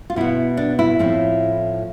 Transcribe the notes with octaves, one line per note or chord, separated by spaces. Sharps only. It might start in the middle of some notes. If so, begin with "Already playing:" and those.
F4
B2 B3 E4
D4
E4
A2 F3 A3 C4